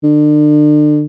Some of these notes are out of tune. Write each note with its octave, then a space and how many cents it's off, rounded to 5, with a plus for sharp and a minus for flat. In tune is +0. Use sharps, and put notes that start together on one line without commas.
D3 +35